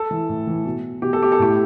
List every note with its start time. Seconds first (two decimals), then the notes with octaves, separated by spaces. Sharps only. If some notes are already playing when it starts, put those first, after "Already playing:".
Already playing: A4
0.11 E3
0.29 A2
0.47 E3
0.65 B2
1.02 B2 G4
1.13 A4
1.23 G4
1.32 A4
1.39 A2 G4